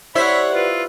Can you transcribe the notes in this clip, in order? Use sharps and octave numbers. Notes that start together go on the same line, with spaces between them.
G3 E4 C5 C#5 E5 F#5 B5
F4 B4